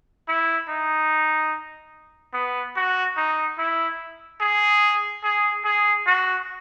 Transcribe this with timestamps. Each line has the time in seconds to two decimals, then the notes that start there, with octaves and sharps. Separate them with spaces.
0.28 E4
0.69 D#4
2.34 B3
2.76 F#4
3.17 D#4
3.58 E4
4.41 G#4
5.24 G#4
5.65 G#4
6.06 F#4